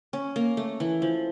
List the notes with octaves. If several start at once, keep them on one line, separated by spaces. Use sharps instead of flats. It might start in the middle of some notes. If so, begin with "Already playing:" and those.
C#4
A#3
A3
E3
F3